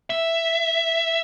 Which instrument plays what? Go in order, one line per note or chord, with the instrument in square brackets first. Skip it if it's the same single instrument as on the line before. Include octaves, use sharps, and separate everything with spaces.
[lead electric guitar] E5